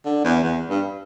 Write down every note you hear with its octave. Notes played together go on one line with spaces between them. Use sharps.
D3
E2
E2
G2